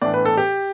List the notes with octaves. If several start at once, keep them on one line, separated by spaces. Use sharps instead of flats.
A2 E3 B3 D4 D5
B4
A4
G4